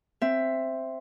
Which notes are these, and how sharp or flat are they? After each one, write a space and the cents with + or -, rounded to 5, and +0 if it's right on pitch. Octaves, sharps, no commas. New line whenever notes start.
C4 +0 E5 +10